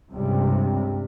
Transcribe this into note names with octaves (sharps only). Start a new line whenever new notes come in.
C#2 G2 C3 G3